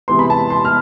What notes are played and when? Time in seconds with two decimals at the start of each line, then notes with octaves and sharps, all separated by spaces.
0.08 C3 E3 G#3 B3 C6
0.19 B5
0.30 A5
0.50 C6
0.65 F6